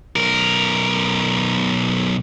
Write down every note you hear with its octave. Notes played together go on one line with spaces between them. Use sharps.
B1 A#4